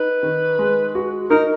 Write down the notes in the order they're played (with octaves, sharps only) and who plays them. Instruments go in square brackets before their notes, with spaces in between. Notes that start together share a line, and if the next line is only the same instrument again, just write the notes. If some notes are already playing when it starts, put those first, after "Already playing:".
Already playing: [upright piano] D#4 [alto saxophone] B4
[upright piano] D#3
G#3
F#4
[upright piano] D#4 [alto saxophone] A#4